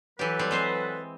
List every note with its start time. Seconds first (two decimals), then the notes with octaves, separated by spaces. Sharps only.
0.19 E3 F#3 G4 A4 B4
0.39 G3 C4
0.51 G#3 C4 C5